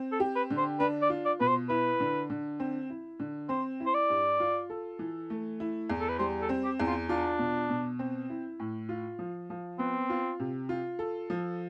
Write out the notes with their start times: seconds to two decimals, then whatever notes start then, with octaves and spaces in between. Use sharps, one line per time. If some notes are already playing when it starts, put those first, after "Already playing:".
Already playing: C4
0.12 A4
0.20 G4
0.35 B4
0.50 D3
0.57 C5
0.80 D4 B4
1.02 D5
1.09 F4
1.25 D5
1.40 B2 B4
1.48 C5
1.69 E4 B4
2.00 D3
2.30 D3
2.60 C4
2.90 E4
3.19 D3
3.49 C4 C5
3.80 E4
3.86 C5
3.94 D5
4.10 G2
4.40 F4
4.70 A4
4.99 E3
5.30 A3
5.60 E4
5.90 E2
6.00 A4
6.09 B4
6.19 G3 C5
6.42 A4
6.49 C4
6.64 G4
6.80 E2
6.87 F4
7.09 D4 F4
7.39 B2
7.70 B2
7.99 C4
8.30 E4
8.60 A2
8.89 F4
9.19 F3
9.50 F3
9.79 B3 C4
10.10 F4
10.40 C3
10.69 F4
10.99 A4
11.30 F3